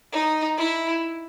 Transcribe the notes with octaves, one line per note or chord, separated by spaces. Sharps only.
D#4
E4